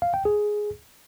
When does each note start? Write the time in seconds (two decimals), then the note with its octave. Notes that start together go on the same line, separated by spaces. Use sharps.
0.02 F5
0.14 G5
0.25 G#4